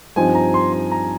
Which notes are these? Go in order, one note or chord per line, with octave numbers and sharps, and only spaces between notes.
G2 F3 C4 D#4 G#5
A#5
C6
C6
A#5